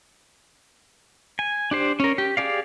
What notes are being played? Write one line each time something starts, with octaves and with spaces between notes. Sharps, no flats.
G#5
D4 G4 C5
C#4 A#4
G4
G4 G#4 D5 F5